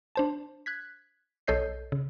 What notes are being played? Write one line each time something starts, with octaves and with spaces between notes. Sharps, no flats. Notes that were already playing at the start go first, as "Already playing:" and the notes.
D4 C5 A5
F#6 G#6 B6
B1 A4 C#5 D#5 G6 C7
C#3